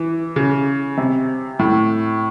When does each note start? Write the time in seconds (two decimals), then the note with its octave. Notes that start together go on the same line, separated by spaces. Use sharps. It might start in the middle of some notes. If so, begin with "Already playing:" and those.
Already playing: E3
0.36 C#3
0.97 C3
1.59 A2